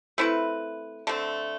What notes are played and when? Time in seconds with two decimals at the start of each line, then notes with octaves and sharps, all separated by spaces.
0.18 A3 C4 E4 B4
1.07 D3 A3 C4